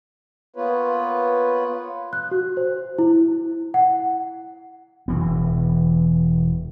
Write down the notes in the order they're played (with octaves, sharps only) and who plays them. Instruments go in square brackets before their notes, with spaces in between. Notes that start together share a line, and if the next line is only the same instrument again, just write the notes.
[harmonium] A#3 B3 F4 B4 C#5
[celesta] F#6
F#4
C5
E4
F#5
[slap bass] E1 E3 B3